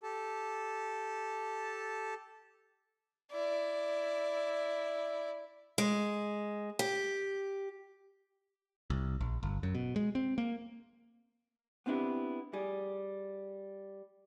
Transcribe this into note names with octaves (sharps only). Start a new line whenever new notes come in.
G4 A4 A5
E4 D5
G#3
G4
C2
A#1
G1
F#2
B2
G#3
C4
A#3
B3 C4 D4 E4 G4
G3 G#4